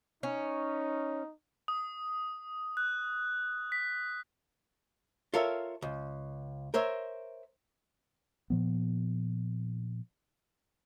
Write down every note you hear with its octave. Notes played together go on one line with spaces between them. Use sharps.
C#4 D#4
D#6
F#6
B6
F4 A4 A#4 C#5 E5
C#2
A#4 C5 C#5 E5
A#2 F3 B3